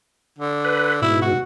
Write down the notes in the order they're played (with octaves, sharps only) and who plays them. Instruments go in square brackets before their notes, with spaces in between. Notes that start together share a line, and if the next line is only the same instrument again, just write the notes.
[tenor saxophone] D3
[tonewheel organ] B4
[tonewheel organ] G#2 B2 [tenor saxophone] E4
[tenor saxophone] F#4